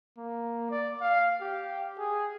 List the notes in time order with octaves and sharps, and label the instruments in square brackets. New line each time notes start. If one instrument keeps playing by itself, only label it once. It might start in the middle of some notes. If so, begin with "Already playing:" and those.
[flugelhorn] A#3
D5
F5
G4
G#4